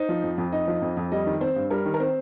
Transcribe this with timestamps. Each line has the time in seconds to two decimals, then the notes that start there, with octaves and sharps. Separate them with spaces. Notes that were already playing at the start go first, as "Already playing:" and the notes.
Already playing: D#4 C5
0.09 F3
0.23 F2
0.38 F2
0.52 D#4 D#5
0.68 F3
0.82 F2
0.97 F2
1.12 G3 D#5
1.26 D#3
1.41 C4 C5
1.56 G2
1.70 G3 A#4
1.85 D#3
1.94 A#4
2.00 C4 C5